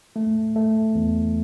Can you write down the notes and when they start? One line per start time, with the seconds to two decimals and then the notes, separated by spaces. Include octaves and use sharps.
0.16 A3
0.56 A3
0.95 E2